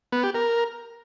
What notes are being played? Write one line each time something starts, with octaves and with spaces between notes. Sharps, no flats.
B3
G4
A#4